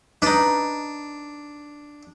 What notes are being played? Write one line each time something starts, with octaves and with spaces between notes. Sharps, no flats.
D4 D#4 B4